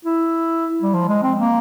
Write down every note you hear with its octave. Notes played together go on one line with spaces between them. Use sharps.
E4
G3
F3
G#3
C4
A#3